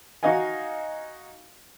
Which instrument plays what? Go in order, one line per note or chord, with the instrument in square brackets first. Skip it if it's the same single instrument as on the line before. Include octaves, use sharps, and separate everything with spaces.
[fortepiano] D#4 F#4 D#5 F5 G#5